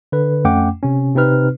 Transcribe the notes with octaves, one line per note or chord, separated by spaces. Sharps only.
D3 B4
F2 A3 C#4 F#5 G5 D6
C3 C#4
C3 C4 D#4 B4 F6